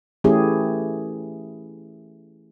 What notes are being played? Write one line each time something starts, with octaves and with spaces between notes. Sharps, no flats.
E3 A3 C#4 E4 G4 G#4